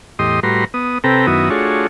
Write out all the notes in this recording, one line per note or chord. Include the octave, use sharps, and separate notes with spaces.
E2 A2 G4 D#5 C6 D#6
A2 G3 F#4 B4 A#5 C6
B3 D#6
C3 C4 A4 B4 G5 A#5
F#2 D#3 B3 E4 F#4 D#6
A3 D4 F4 F#4 G#4 C#5